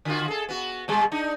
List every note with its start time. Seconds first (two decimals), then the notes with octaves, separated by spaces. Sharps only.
0.05 D3 F4 F#4
0.28 G#4 A4
0.49 B3 F#4
0.88 B2 G3 G#3
1.12 D4 D#4